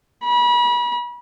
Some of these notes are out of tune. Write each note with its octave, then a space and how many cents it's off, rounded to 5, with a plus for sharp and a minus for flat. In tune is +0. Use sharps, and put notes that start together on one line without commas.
B5 -35